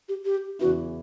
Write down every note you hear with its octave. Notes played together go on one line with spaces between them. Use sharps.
G4
G4
E2 C#3 E3 B3 E4 F#4